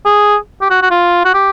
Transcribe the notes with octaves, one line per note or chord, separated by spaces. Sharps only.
G#4
G4
F#4
F#4
F4
F#4
G4